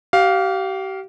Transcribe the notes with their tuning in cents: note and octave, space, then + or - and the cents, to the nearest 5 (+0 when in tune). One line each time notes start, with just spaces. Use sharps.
G4 -35 F5 +5